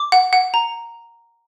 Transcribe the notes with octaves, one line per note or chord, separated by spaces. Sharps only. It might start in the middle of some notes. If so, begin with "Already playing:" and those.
Already playing: D6
F#5
F#5
A#5